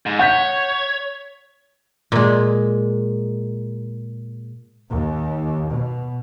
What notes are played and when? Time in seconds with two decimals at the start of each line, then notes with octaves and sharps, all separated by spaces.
0.06 G#2
0.19 C#5 F#5 G6 B6
2.12 A#2 G#3
4.90 D#2
5.70 B2